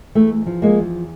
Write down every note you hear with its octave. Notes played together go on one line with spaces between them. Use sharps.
E2 A3
F3
G#3 A#3
E2